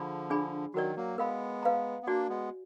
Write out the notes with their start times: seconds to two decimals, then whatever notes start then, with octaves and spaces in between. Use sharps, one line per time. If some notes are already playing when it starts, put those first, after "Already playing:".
Already playing: D3 F3 G#4 D5 G#5 B5
0.30 D4 G#4 D5 G#5 B5
0.74 D#3 F#3 F#4 A#4 D5
0.96 F#3 A#3
1.18 G#3 B3 A#4 F5 B5
1.63 B4 F5 A#5
2.03 B3
2.07 A#3 D4 F#4 D5 G#5
2.29 G#3 B3